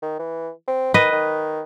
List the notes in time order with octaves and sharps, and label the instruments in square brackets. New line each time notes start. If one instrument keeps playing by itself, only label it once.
[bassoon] D#3
E3
C4
[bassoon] D#3 [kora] B4 D#5
[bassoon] D#3